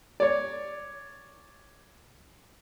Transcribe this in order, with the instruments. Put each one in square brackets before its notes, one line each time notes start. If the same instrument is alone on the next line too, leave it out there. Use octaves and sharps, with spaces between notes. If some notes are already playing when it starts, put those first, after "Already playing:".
[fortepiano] C#5 D5